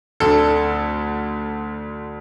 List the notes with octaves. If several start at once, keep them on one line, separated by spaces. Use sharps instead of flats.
D2 D3 A4